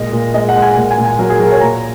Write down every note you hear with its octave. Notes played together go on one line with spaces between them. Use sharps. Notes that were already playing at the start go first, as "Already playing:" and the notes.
Already playing: A#2 G#3 D#5
A#2
G#3 D#5
F#5
G#3
G#5
A#2
G#5
A#2
G#5
F#3 A#4
G#4
F#3 A#4
C#5
A#2 A#5